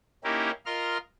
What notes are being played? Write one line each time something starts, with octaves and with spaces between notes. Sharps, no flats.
A#3 C#4 D#4 E4 G4 A#4
F4 A#4 D#5 C6 F6